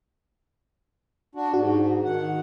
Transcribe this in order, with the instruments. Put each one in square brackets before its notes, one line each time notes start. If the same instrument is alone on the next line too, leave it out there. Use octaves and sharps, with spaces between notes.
[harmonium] D4 F#4
[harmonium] G#2 [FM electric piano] F#4
[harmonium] D#3 F#5